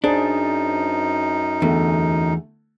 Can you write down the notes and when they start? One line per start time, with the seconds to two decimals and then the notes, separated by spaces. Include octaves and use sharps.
0.04 F#2 D4 D#4 G#4 C5 A5
1.62 E2 D3 A3